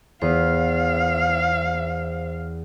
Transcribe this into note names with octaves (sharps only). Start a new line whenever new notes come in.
E2 B3 C5 F5